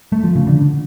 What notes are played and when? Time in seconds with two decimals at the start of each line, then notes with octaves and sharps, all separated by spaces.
0.12 A3
0.24 F3
0.35 C#3
0.47 D3